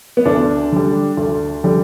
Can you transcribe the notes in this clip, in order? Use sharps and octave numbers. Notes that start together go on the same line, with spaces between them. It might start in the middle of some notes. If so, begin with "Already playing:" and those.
B3
D2 D4
D3 G3
D2
D3 G3